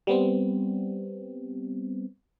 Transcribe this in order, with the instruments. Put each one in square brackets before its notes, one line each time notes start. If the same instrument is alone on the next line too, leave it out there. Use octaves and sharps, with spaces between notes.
[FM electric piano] G3 B3 C4